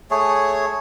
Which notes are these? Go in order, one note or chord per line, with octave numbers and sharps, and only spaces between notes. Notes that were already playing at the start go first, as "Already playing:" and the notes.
A3 G#4 C#5